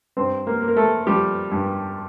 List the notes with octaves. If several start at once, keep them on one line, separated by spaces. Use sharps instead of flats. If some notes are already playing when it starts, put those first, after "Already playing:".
G2 C4 C5
A#3 A#4
A#3
A#4
A3 A4
F3 G3 G4
G2